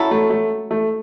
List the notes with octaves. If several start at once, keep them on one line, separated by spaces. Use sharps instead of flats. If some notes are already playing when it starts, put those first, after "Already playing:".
Already playing: F#3 C#4 E4 A4
A3
A3
A3